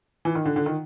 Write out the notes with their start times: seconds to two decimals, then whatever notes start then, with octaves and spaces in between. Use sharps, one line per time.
0.25 E3
0.35 D#3
0.46 D3
0.56 D3
0.66 D#3